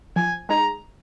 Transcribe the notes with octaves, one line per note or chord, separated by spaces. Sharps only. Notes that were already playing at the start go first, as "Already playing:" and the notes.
F3 G#5
G#3 D#4 G#4 A#5